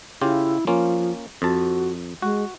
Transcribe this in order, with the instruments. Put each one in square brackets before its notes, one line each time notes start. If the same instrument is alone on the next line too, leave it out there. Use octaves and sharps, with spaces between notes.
[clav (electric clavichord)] C#3 F4 G4 [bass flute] E4
[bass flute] F3 [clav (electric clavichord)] A#3 C#4 F4
[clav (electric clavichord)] F2 A5 [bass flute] F#4
[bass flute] G#3 [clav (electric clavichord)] F#4